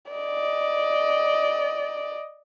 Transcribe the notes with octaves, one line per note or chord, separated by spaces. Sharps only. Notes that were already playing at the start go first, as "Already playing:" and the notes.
D5 D#5